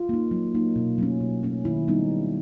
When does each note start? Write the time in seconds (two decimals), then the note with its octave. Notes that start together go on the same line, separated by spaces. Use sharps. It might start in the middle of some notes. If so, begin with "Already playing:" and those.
Already playing: F4
0.09 A#3 D#4
0.31 F#3
0.54 A#3 D#4
0.76 B2
0.98 F#3 A3 C#4
1.21 B2
1.43 F#3 A3 C#4
1.65 D#3 E4
1.88 G3 B3 D#4